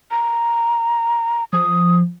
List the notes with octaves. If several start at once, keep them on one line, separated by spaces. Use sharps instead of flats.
A#5
F3 D#6